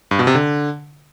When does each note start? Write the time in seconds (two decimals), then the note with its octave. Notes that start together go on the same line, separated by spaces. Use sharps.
0.11 G2
0.19 B2
0.27 C3
0.35 D3